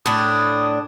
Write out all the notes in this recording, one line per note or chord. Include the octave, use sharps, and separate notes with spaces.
A2 D4 D#6